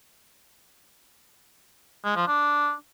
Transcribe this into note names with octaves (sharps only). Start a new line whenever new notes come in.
G#3
F3
D4